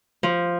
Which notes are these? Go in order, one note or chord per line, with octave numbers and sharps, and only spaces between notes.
F3